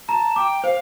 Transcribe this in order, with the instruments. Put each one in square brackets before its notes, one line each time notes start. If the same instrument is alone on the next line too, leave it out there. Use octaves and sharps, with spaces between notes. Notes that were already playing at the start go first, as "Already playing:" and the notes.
[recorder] A5 [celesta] A#5
[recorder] G5 [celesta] D6
[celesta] C5 [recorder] F5